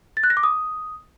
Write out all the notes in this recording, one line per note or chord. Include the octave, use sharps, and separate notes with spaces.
A6
F#6
A#6
D6
D#6